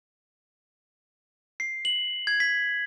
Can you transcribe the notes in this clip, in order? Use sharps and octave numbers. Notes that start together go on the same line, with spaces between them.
C7
F#7
G#6
B6